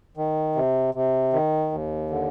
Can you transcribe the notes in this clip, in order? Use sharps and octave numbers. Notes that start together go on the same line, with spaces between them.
D#3
C3
C3
D#3
D#2
D3